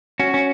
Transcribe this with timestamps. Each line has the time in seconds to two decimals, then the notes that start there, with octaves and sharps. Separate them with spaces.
0.20 C#4 F#4
0.34 C#4